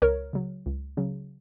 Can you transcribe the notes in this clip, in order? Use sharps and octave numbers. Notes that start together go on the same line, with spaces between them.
C#2 A#4 C#5
C#3 F#3
C#2
C#3 F#3